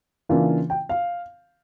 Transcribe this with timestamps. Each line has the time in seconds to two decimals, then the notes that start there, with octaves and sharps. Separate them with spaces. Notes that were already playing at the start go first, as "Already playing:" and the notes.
0.29 C#3 E3 A#3 D4 F4
0.70 G5
0.89 F5